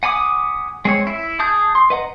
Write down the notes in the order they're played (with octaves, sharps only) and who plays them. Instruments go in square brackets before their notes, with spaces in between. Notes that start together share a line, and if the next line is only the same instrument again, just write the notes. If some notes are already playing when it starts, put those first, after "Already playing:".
[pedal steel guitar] F#5 G#5 B5 D6 D#6
G#3 C4 C#5
E4 E5
G#4 A5 D#6 G6
C6
B4 D#5 F#5 A#5